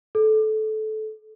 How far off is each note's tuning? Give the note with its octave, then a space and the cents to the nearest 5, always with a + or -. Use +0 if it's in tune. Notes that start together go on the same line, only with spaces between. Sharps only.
A4 -20